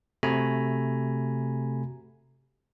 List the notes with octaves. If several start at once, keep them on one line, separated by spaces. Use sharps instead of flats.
C3 A3 F#4 G#5 A#5 B5